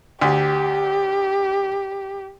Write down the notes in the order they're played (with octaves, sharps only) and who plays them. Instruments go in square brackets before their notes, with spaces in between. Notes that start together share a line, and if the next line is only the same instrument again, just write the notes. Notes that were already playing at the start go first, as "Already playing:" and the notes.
[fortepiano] D2 [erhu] G4